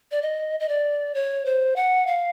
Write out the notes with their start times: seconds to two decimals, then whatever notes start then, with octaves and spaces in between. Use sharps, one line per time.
0.11 D5
0.22 D#5
0.60 D#5
0.69 D5
1.14 C#5
1.45 C5
1.76 F#5
2.07 F5